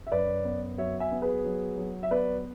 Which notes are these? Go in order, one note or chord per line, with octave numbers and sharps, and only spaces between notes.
E5
F#2 B4 D5
B3
F#3 C#5 E5
E5 G#5
B3
G#4 B4
F#3
F#3
E5
B3 B4 D5